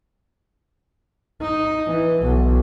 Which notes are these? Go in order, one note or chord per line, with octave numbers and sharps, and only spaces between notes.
D#4
E3
B1